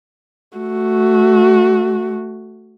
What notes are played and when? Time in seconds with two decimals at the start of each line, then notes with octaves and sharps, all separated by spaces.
0.58 A3 F#4